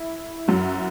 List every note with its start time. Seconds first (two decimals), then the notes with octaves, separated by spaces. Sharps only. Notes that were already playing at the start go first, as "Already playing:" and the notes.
Already playing: E4
0.48 F#2 F#3